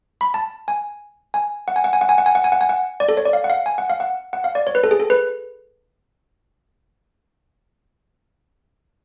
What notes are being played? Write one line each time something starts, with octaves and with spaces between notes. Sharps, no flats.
B5
A5
G#5
G#5
F#5
G#5
F#5
G#5
F#5
G#5
F#5
G#5
F#5
G#5
F#5
G#5
F#5
D5
A4
C#5
D5
F5
F#5
F5
G#5
F#5
F5
F#5
F#5
F5
D5
C#5
B4
A4
G#4
A4
B4